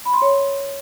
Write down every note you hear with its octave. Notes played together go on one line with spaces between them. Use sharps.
B5
C6
C#5